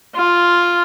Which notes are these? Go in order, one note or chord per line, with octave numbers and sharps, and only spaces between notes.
F4